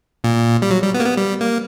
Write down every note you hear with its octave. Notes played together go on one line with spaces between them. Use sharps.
A#2
G3
F#3
G3
B3
A#3
B3
G3
A#3